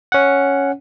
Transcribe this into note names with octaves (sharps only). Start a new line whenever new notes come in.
C#4 F#5